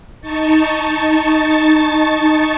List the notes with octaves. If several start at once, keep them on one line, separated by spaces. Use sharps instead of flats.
D#4 A5 C#6 A6